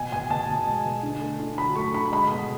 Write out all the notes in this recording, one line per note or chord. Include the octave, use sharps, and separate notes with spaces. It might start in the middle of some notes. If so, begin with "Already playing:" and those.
Already playing: B2 G#5
B2 G#5
B2 A5
B2
G#3
B2
D3
A3
D3
F#3 B5
A3 C#6
D3 B5
G#3 B5
B2